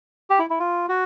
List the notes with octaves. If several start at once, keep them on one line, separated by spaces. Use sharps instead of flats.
G4
E4
E4
F4
F#4